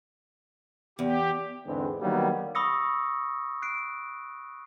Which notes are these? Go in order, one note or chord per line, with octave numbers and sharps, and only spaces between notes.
E2 G4
E2 G#2 D3 G#3 B3 C4
D3 D#3 F#3 G3 A#3 B3
B5 C#6 D#6 E6 A#6 C#7
F#6 C7 D7